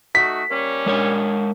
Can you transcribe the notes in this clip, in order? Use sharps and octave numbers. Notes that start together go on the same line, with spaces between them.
A3 D#4 F#4 B6
G3 A#3 C#4
G#3 A#4 C#5